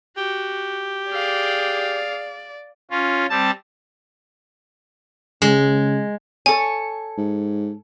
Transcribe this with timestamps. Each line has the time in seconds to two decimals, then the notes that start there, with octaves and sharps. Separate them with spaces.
0.17 F#4 G4
1.11 G#4 D5 F5
2.91 C#4 F4
3.30 G3 C4 A5
5.42 C#3 G#3
6.46 A4 C#5 G#5
7.18 G#2